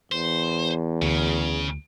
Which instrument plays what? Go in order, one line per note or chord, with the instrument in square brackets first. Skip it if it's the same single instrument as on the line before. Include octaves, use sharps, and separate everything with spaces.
[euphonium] E2 [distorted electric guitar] C5
[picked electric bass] D2 [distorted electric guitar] C#3